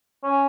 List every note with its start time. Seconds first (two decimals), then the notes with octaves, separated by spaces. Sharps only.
0.24 C#4